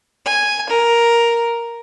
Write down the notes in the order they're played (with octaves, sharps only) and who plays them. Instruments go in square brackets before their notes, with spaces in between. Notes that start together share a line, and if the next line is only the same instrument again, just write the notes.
[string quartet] G#5
A#4